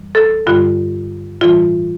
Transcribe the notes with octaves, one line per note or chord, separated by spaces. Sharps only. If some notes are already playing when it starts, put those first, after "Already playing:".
Already playing: F2 E3 G3
A4
G2 D3 G3 F4
A2 E3 G3 F4